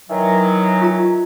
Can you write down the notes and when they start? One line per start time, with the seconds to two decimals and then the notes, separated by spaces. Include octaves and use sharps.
0.10 D#3 E3 F#3
0.82 F4 A#5